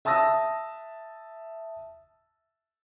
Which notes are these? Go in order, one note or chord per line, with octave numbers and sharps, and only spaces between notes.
E5 A5 D#6 E6 A#6